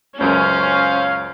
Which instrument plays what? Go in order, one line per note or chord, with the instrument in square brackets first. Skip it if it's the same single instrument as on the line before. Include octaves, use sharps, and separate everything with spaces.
[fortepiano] C#2 F#2 [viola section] C#4 [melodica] C5 [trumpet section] F5